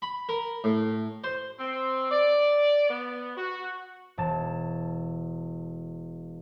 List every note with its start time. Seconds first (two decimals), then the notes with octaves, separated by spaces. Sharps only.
0.02 B5
0.29 A#4
0.64 A2
1.24 C5
1.59 C4
2.11 D5
2.89 B3
3.36 F#4
4.18 E1 A5